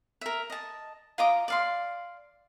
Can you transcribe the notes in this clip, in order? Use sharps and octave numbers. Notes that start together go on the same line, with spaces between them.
A#4 E5
D#5 A5
F4 D#5 A#5 D6
D5 F5 C6